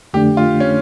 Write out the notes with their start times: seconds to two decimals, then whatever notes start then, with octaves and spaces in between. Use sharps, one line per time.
0.14 F2 D3 A3 D4 G4
0.37 F4
0.60 C#4